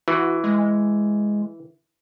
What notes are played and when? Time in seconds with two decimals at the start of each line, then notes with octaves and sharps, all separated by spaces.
0.08 E3 F#4
0.44 G#3